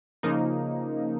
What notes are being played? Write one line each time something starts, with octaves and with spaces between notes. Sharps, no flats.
C#3 F3 A#3 D#4